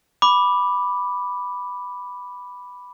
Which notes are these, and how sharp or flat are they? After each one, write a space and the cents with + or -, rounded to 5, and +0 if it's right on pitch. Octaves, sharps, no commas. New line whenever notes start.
B5 +0 D6 +0